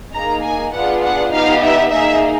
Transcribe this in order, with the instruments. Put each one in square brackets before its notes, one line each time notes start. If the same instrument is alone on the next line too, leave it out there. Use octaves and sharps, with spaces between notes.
[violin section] A#3 D#4 G#4 A#5
G#5
B3 D4 F4 G#4 F#5
F#5
B3 D#4 G4 F5
E5
A#3 D#4 G#4 E5